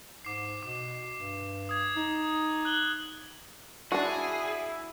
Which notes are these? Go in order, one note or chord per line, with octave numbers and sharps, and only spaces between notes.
G#2 D6 C7
B2 D6
G2
D#6 G#6
D#4
F#6 F#7 G7
D4 E4 F#4 G#4